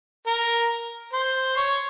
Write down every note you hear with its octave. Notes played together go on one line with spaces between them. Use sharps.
A#4
C5
C#5